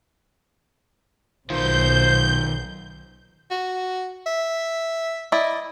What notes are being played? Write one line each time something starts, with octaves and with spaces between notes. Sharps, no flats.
B1 B2 D#3 F4 C5 G6
F#4
E5
E4 D5 D#5